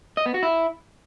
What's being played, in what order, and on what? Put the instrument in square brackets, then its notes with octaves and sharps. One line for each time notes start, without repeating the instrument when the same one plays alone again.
[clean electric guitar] D#5
B3
F#4
E4